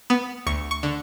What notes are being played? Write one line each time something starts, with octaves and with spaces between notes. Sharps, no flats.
B3
D2 C#6
C#6
D3